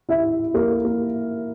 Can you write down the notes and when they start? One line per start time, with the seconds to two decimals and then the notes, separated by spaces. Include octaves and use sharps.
0.09 E4 E5
0.54 A#3 A#4
0.85 A#3